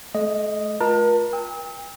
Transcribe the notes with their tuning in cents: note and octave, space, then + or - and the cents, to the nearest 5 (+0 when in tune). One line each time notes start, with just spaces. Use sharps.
A3 -40 D#5 +0
F4 +25 A#4 +40 A5 +35
G5 +35 E6 -45